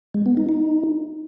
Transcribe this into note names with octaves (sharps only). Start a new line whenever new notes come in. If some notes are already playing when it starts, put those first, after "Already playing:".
G#3
B3
D#4
D#4